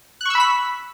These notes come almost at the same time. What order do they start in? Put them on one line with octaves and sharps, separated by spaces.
F#6 C#6 E6 B5 B6